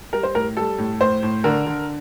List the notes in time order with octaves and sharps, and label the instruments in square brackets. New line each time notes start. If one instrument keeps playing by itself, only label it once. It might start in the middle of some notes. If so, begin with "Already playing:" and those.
[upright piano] G3 A#4
C5
A2 A#4
G3 A4
A2
A2 C5
A2
D3 A#4
D3